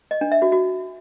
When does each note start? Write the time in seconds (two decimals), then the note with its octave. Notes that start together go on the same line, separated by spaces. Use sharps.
0.11 D#5
0.21 D4
0.32 E5
0.42 F#4
0.52 F#4